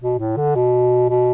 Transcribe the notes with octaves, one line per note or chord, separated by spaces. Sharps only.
B2
A2
D3
B2
B2